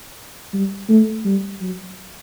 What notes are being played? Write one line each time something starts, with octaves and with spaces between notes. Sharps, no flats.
G3
A3
G3
F#3